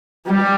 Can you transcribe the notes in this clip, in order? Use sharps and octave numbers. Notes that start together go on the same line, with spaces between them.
G3